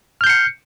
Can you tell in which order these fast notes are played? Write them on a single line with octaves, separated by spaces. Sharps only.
F6 G6 C7 C#7